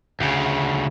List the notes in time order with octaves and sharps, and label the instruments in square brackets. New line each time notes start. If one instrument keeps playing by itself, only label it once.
[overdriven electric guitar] D2 C#3